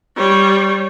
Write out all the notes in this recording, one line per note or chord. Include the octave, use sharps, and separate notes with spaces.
G3 C#5